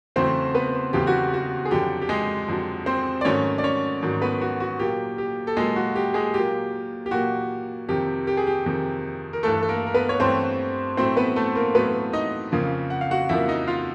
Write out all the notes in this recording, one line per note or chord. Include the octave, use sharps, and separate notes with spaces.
E2 C#3 F#3 A3 C4 C5
B3 B4
E2 C#3 F#3 A3 G4
F#4
F#4
G#4
F2 D3 F#3 G4
G4
G#3 G#4
F2 D3 F#3
C4 C5
D5
G#2 D#3 F#3 A3 C#4 C#5
D5
C#4 C#5
G#2 D#3 F#3 A3
B3 B4
F#4
F#4
A#2 F#3 A#3 G4
G4
A4
A#2 F#3 G#3 A#3 G#4
F#4
G4
G#3 G#4
A#2 F#3 A#3 G4
G4
A#2 F#3 A#3 F#4
F2 C3 D#3 G4
G4
G#4
G4
F2 C3 D#3
A#4
G2 E3 A3 A4
A4
A#3 A#4
A#4
B3 B4
C#5
G2 E3 A3 C4 C5
A2 F#3 A3 C4 C5
B3 B4
A3 A4
A#3 A#4
A2 F#3 A3 B3 B4
D#4 D#5
F2 C#3 F3 A#3
F#5
F5
F#4 F#5
F2 C#3 F3 A#3 E4 E5
D#4 D#5
F4 F5